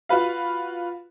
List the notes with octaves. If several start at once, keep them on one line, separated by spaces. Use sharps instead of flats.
F4 F#4 B4 F5